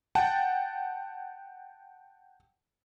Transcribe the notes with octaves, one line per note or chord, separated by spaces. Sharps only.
F#5 G5 A5 A6